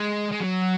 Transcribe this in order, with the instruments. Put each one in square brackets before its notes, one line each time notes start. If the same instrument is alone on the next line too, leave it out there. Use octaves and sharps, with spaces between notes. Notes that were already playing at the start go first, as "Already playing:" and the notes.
Already playing: [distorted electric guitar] G#3
G#3
F#3